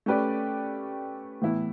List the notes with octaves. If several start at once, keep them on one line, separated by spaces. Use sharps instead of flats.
A3 C#4 G4 B4 D5
A2 E3 B3 E4